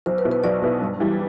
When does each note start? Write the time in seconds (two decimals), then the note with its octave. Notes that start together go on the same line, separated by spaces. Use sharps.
0.06 B1 C5
0.18 B4
0.25 B2 B3 E4
0.31 B4
0.44 B1 D5
0.62 B2 B3 E4
0.81 G2
1.00 E3 G3